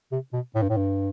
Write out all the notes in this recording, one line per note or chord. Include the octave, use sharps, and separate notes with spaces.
C3
B2
A2
G2
A2
G2